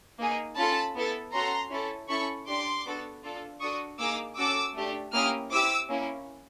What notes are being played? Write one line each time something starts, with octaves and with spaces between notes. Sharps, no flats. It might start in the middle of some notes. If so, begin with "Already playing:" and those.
A#3 D#4 G#4
C#4 F4 A4 A5 B5
B3 E4 A4
C#4 F#4 A4 A#5 C6
C#4 E4 A4
C#4 E4 A4 B5 C#6
D4 G4 C6 D6
B3 D4 F#4 A4
D4 F4 A4
D4 F#4 A4 C#6 D#6
A#3 D#4 G#4 D6 E6
C#4 F#4 A4 D6 E6
A3 D4 G4
A#3 C#4 E4 G4 D#6 F6
C4 E4 G4 D6 E6
A#3 C#4 E4